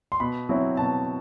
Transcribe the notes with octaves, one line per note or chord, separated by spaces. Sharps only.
C6
B2 B5
F#3 C4 E4
B2 A5